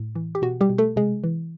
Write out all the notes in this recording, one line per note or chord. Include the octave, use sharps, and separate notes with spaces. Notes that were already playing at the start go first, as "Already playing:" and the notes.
Already playing: A2
E3
G4
B2 F#4
G3 G4
B2
A3 A4
C3 G#3 G#4
E3